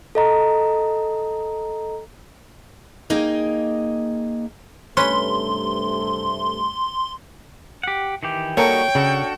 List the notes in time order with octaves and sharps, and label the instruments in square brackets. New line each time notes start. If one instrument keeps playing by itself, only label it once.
[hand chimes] A4 D#5 A#5
[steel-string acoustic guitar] A#3 D#4 G#4 D#5 G5
[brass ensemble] G2 C3 A3 [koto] C#4 B4 [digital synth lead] C6
[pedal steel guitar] G4 F#5
D#3 E3 G4
[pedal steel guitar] G3 D#4 F#4 [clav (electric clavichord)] A#3 A4 A#4 [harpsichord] C#5 [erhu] G5
[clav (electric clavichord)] C#3 [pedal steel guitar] D4 F#4 A4